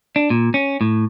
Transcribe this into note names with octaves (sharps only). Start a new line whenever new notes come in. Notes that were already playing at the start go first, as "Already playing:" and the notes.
D4
A#2
C#4
A2